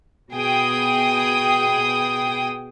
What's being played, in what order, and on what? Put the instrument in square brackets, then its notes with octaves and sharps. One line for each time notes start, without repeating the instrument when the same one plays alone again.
[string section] B2 G#4 G5 D#6